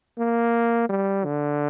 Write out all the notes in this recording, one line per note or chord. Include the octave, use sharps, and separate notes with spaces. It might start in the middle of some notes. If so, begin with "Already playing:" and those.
A#3
G3
D3